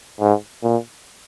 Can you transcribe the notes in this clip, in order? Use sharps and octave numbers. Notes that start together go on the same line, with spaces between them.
G#2
A#2